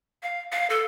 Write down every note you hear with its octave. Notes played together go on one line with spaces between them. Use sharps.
F5
F5
A4